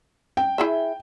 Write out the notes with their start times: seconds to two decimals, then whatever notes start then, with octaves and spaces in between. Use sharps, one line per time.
0.37 G5
0.58 E4 G#4 E5